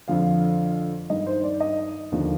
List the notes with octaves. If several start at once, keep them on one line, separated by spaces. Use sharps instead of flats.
F2 D3 F3 F5
G2 D#3 D#5
C5
D5
D#5
D#2 D3 F3